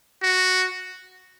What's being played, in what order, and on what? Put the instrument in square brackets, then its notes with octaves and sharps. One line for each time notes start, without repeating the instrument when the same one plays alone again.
[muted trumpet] F#4